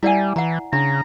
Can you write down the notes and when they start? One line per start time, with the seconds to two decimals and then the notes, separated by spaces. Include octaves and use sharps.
0.03 G3 E4 D5 E5 F#5 G#5
0.36 E3 F#5 A#5
0.73 C#3 D4 A#5 B5